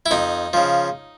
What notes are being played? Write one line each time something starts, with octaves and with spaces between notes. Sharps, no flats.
E4
F2 D#4
C#3 F3